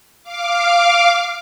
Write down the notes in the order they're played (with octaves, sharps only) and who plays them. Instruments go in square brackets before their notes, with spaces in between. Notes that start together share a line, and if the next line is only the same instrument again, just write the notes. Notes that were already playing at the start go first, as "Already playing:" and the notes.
[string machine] F5 D6